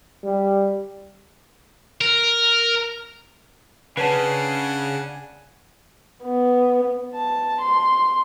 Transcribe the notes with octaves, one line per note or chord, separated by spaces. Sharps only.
G3
A#4
C#3 D4 B4 F#5 G#5 A5
B3
A5
C6